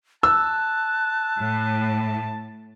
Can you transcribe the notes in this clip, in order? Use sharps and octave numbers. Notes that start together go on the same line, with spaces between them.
A5 E6 F#6
A2